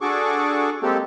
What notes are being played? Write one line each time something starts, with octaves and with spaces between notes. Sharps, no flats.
D4 F#4 G#4 A4 C#6 D6
G3 G#3 A#3 C4 G4 A4